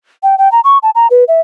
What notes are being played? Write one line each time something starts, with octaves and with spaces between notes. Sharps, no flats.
G5
G5
A#5
C#6
A5
A#5
B4
E5